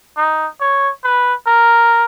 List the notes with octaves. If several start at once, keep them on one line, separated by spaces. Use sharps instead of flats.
D#4
C#5
B4
A#4